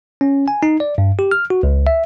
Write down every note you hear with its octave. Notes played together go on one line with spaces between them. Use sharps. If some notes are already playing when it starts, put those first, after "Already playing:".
C#4
G#5
D#4
D5
G2
G4
F6
F#4
C#2
E5